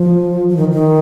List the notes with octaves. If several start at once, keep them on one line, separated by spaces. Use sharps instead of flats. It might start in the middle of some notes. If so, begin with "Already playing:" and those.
Already playing: F3
F3
D#3
D#3